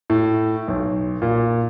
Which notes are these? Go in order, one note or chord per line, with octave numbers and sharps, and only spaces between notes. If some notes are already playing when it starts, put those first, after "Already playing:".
A2
B1
A#2